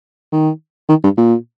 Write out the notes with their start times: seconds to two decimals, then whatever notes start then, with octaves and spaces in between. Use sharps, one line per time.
0.33 D#3
0.89 D#3
1.04 G2
1.17 A#2